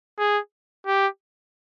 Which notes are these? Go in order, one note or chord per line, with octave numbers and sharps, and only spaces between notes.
G#4
G4